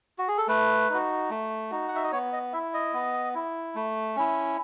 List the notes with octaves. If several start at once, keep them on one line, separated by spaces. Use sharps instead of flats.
F#4
G#4
A4
A3 B4
D#4 F#4
A3
D#4 F#4
F#5
E5
D#5
B3 C#5
D#5
E4 E5
D#5
B3
E4
A3
C#4 E4